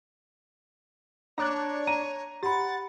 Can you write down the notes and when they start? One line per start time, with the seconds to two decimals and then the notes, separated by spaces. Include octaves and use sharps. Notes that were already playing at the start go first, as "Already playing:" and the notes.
1.38 D4 C#5 A#5 D6 F#6
1.87 A#5 D#7
2.43 G4 F#5 B5 A6